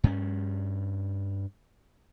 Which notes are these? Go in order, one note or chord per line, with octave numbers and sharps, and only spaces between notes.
G2 C#4